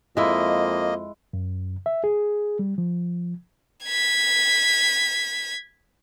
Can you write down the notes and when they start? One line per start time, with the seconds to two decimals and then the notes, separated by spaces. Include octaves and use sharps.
0.17 F2 G#3 A#3 E4 D#5
1.33 F#2
1.86 E5
2.04 G#4
2.59 G3
2.78 F3
3.86 G#6 B6